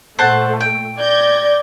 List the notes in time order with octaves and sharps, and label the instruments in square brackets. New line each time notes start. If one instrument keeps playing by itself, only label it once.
[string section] A#2 A3 [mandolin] C5 F#5 A5
[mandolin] G5
[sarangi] D5 [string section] G6 G#6 A#6